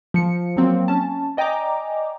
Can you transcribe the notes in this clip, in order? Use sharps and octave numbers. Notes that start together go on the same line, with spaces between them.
F3 C#7
F#3 A#3 C4
C#4 A5
D5 D#5 G5 G#5 A#5 D6